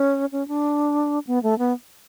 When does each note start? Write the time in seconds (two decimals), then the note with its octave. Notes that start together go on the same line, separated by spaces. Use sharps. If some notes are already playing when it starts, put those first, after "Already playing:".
Already playing: C#4
0.32 C#4
0.48 D4
1.27 B3
1.43 A3
1.58 B3